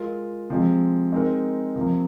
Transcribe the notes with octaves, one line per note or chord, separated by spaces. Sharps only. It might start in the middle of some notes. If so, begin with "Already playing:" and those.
Already playing: G#3 F4 A#4
C3 F3 G#3 C4
G#3 C4 D#4 A#4
C3 F3 A#3